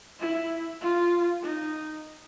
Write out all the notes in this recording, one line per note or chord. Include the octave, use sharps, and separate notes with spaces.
E4
F4
D#4